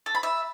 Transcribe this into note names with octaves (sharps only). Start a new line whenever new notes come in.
A4
B5
E5